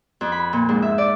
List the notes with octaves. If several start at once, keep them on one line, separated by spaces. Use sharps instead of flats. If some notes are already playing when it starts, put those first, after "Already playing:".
F2
B5
A#2
G#2
E5
D5